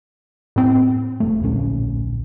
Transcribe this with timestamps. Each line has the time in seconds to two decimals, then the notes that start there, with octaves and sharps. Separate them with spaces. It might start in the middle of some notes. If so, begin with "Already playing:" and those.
0.56 A2 C4
1.20 E1 A3
1.43 D1 A#1 C#4